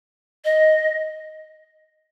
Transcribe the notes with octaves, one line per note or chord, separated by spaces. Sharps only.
D#5